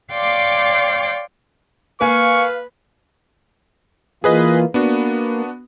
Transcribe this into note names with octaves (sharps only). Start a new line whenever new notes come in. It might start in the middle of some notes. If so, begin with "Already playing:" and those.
C#5 D5 F5 G5 C6 D6
A#3 B4 F5 G#5 C#6
E3 A#3 F4 G#4 B4 D#5
A#3 B3 D4 F#4